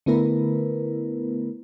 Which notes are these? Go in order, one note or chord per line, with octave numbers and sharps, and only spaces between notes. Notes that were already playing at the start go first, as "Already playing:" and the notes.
D3 A3 B3 E4 A#4 B4